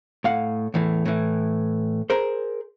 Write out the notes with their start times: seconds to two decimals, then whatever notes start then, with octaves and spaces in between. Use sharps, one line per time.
0.24 A2 F5 F#5
0.74 E2 A2 E3
1.06 A2 E3
2.10 G#4 A#4 C5